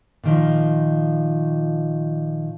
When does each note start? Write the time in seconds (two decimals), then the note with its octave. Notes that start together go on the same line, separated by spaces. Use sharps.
0.24 A#2 D#3 F3